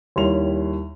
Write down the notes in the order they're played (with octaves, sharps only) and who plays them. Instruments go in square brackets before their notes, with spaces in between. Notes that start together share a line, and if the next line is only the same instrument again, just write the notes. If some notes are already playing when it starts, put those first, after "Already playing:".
[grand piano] D#2 G3 E4 C#5 C6 F7